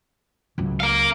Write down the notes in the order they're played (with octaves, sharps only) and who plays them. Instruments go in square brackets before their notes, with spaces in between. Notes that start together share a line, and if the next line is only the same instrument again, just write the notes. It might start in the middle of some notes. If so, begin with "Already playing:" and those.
[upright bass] C#2 F#3
[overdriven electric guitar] A#4 F5